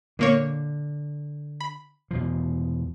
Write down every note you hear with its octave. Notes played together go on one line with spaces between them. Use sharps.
A#2 D3 A#3 C#5
B5
E2 B2 F3